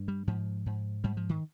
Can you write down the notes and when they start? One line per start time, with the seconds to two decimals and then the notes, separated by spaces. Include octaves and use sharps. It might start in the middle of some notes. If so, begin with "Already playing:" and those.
Already playing: G2
0.08 G3
0.27 G#2 F3
0.66 G#2
1.04 G#2 G3
1.17 F3
1.29 D#3